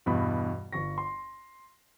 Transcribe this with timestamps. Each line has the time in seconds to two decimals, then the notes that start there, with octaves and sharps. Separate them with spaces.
0.06 E2 G2 B2 B5
0.73 G1 C#6 A#6
0.98 C6